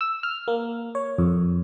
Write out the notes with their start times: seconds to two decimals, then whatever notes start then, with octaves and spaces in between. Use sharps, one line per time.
0.01 E6
0.23 F6
0.48 A#3
0.95 C#5
1.18 F2